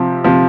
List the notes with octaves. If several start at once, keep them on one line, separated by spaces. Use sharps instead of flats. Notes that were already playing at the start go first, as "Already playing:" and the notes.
Already playing: C3 F3
C3 F3